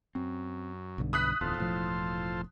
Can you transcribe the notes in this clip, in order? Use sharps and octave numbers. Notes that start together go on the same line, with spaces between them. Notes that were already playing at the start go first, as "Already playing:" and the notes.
F#2 C4
B1 G2 D3
B4 D#6 F#6 B6
D1 E2 F4 A4 C5
E1 A2 F3